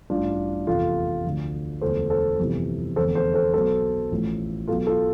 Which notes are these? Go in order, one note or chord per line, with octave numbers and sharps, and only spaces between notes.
A1 G2 E3 D4 F4
F1 E2 C3 F3 F4 A4
D2 D3 F3
E1 D2 D3 F3 A4 C5
A4 C5
G1 F2 C3 E3
F1 E2 D3 A4 C5
A4 C5
A4 C5
B1 B2 A4 C5
A1 A2 F3
B1 B2 F4 A4
F4 A4